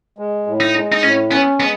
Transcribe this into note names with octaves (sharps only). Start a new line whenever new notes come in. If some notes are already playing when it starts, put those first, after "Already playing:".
G#3
A2
D#4
G#3
D#4
A2 C#4
B3 C#4
G#3 B3